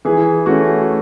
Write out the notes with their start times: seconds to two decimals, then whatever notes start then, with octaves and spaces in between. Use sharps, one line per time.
0.05 E3 G#4
0.46 A3 C#4 F#4